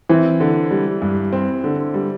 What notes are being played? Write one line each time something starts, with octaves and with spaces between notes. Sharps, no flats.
E3 C4
D3
G3
G2
C4
D3
G3